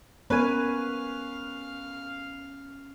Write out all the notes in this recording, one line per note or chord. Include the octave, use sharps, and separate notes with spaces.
B3 C#4 A#4 B4 F5 G#5